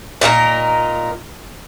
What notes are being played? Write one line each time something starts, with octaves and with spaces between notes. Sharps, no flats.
A#2 D#4 F4 A#4